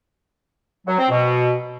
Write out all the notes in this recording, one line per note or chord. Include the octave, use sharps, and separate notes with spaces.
F#3
C4
B2